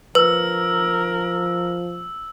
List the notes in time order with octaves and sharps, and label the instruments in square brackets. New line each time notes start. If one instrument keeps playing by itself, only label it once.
[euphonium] F3 [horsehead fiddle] A#4 [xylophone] B4 [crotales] E6